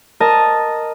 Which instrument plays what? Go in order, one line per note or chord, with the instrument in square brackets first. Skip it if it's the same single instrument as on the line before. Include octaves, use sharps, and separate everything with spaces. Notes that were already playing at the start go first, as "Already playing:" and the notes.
[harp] A#4 D#5 A5